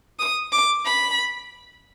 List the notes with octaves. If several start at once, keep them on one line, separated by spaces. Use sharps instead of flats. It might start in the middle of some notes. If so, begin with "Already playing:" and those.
D#6
D6
B5